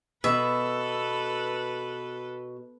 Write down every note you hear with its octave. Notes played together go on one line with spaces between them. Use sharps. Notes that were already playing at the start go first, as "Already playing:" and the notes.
B2 A4 B4 E5